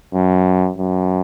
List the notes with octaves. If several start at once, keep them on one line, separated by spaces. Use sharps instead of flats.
F#2
F#2